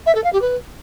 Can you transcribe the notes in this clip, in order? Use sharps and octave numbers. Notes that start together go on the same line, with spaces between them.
E5
A4
F5
G4
B4